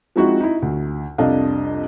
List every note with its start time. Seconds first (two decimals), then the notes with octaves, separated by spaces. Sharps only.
0.16 F3 G#3 C4 D#4 E4 F#4
0.40 D#4 E4
0.62 D2
1.18 C2 F2 D4 A4 D#5 F5